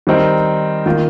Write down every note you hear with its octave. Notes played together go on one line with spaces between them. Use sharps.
D#3 G3 C4 D#4 A#4
D#3 A#3 F4